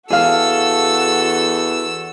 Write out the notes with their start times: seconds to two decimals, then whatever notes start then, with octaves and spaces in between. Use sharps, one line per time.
0.10 E2 F#4 G#4 A4 F5 E6